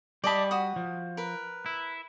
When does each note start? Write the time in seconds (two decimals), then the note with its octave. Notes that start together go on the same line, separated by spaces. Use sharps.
0.24 G3 D5 D#5 A5 B5
0.51 F#4 D#6
0.76 F3
1.17 A#4 B4
1.66 E4